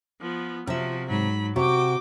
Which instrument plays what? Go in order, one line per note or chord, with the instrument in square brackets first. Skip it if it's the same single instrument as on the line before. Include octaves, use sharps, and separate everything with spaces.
[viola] F3 B3
[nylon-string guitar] C3 E5 [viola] F3 F#4
[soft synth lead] G#2 [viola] F#3 B5
[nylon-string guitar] C3 [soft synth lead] F#4 [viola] G5 D6